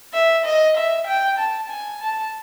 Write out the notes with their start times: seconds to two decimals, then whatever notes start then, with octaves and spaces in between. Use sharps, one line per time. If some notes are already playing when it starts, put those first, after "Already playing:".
0.13 E5
0.45 D#5
0.77 E5
1.07 G5
1.38 A5
1.70 G#5
2.01 A5